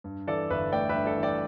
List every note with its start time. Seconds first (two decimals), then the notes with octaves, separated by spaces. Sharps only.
0.04 G2
0.27 E3 A4 D5
0.50 G1 B4 E5
0.72 A3 D5 G5
0.89 G2 B4 E5
1.06 A4 D5
1.17 E3
1.23 D5 G5